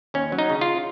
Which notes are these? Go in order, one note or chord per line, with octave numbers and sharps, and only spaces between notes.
D#2 C#4
F#3
D#4
C#3
F4